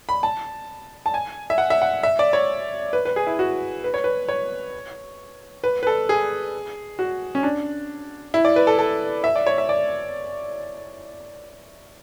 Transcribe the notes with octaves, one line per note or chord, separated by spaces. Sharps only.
B5
A5
A5
G#5
E5
F#5
E5
F#5
E5
D5
C#5
B4
B4
G#4
E4
F#4
B4
C#5
B4
C#5
B4
B4
A4
G#4
F#4
C#4
D4
E4
D5
B4
A4
A4
E5
D5
C#5
E5
D5